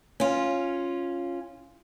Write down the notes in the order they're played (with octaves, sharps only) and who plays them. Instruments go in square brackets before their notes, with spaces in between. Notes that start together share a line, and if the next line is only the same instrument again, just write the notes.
[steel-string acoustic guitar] C#4 F4